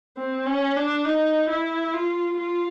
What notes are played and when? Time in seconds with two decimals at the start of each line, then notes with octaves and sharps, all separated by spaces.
0.17 C4
0.46 C#4
0.76 D4
1.04 D#4
1.50 E4
1.93 F4
2.37 F4